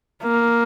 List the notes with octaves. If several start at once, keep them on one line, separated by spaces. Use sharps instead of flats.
A#3